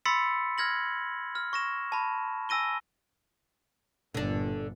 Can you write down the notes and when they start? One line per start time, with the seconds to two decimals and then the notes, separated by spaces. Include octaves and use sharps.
0.05 B5 C6 E6 A6 B6 C#7
0.58 F6 G#6 A#6 F#7
1.35 F6
1.53 C#6 A#6 E7
1.92 A5 B5
2.49 G#5 E6 A#6 D#7 G7
4.14 G1 A#2 D3 D4